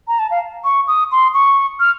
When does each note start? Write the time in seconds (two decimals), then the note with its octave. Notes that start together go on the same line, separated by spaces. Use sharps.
0.08 A#5
0.19 A5
0.31 F5
0.64 C#6
0.88 D#6
1.12 C6
1.34 C#6
1.80 F6